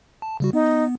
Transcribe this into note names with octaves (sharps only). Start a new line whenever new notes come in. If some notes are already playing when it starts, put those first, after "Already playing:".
A5
C#3 G3 F#4
B3 D#4